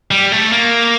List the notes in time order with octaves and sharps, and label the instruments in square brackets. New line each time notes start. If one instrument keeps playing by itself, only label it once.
[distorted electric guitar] G3
A3
A#3